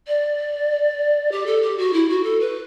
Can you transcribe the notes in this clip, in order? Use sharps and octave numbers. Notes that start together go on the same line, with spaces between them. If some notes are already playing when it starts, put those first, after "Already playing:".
D5
G4
A4
G4
F#4
E4
F#4
A4
B4